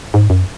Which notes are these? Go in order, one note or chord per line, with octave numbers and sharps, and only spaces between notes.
G#2
F#2